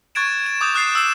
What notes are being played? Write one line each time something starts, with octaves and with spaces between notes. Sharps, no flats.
C#6 F#6 G#6 A6 D7 E7
E7
D6 D#6 G6 F7
D#6 F#6 A6 C7 E7
E6 C7 E7